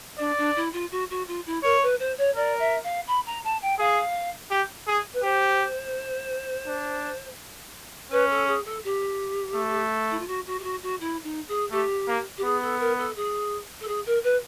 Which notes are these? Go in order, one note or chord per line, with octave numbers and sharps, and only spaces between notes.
D4 D5
D4
E4
F4
F#4
F#4
F4
E4
A#4 C#5
B4
C5
C#5
A#4 D5
E5
F5
B5
A#5
A5
G5
G#4 F5
G4
G#4
B4
G4 C5
D4
C#4 B4
A4
G#4
A4
G4
A3
E4
F4
F#4
F#4
G4
F#4
F#4
E4
D#4
G#4
A3 G4
A#3
G4
B3 G#4
A4
A#4
A4
G#4
A4
G#4
A#4
B4